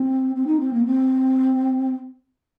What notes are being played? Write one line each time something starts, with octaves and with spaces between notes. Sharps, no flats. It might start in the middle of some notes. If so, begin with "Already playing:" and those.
Already playing: C4
C4
D#4
C4
A#3
C4